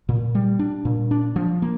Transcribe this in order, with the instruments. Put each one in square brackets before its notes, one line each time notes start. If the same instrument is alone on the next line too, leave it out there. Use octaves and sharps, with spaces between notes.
[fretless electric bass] A#2
G3
D4
A#2
D4
F3
A#3